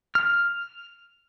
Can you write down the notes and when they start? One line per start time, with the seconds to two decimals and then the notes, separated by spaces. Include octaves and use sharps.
0.15 F6